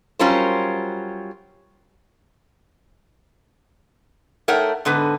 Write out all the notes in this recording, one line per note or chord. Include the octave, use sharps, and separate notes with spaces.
F#3 G3 C#4 F4 A#4 C5
A3 D#4 A#4 C#5 F#5 G5
G#2 D3 B3 B4